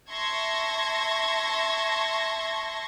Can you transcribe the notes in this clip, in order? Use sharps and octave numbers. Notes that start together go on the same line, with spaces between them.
E5 A5 C6 C#6 G#6 A#6